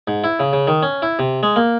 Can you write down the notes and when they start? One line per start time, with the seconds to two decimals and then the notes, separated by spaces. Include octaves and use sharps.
0.08 G#2
0.24 E4
0.40 C#3
0.53 C#3
0.67 D#3
0.83 C#4
1.02 E4
1.19 C3
1.43 G#3
1.56 A#3